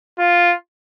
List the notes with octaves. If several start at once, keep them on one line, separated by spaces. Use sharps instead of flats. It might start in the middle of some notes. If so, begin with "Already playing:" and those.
F4